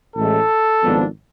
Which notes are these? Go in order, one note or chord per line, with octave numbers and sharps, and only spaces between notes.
A1 A2 G#3 A4
G#1 G#2 F3 B3 D4